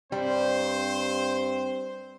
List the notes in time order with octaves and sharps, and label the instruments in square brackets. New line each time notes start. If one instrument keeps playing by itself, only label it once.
[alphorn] G2 [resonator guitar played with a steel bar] G3 [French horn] C4 [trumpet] C5